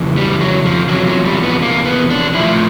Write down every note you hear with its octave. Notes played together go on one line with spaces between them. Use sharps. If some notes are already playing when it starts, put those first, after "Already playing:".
Already playing: F2 C#3 E3
G3
F#3
F3
E2 C3 F3 F#3
F#3
G3
B3
A#3
B3
D4
A2 F3 E4